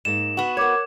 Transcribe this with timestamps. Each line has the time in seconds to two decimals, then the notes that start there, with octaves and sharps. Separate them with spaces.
0.05 G#2 A#3 E7
0.37 B3 F#4
0.57 A#4 C#5 F#5 D6 G#6